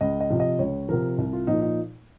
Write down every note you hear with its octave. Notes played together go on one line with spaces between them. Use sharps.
C#2 D#5
D#5
C3 F3
D#5
C#2 C#5
C3 F3 A#4
C2
F4
A#2 F3 D#4
D#4